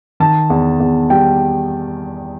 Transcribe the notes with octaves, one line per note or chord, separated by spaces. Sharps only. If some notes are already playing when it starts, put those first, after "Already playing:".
D#3 A5
E2
E2
G3 G5